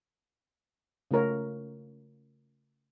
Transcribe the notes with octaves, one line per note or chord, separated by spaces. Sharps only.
C#3 A3 F4 A#4 C#5